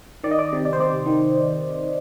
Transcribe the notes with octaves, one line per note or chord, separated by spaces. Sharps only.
D#3 D5
D#5
D5
C3
D5
C5
C3 D5
D#3